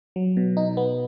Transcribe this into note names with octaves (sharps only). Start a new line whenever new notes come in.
F#3
B2
D#4
B3